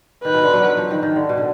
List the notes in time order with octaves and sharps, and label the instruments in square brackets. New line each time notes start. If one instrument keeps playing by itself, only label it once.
[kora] D#3 [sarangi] B4
[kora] B2
D3
F#3
F#3
F3
D#3
D#3
D3
B2
D3